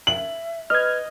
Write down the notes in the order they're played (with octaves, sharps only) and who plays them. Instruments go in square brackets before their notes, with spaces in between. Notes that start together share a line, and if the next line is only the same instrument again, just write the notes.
[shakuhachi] E5 [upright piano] F#7
[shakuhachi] B4 [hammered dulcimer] D#5 [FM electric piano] F6 G#6